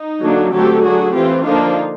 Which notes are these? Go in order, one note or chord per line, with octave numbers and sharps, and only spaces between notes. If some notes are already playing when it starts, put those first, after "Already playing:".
Already playing: D#4
D3 F#3 A#3 D4
D3 F#3 A3 C4 G4 A4
F#3 A3 D4 F#4 G#4
E3 A3 C4 F4 G4
D3 F3 A#3 D4 D#4 F4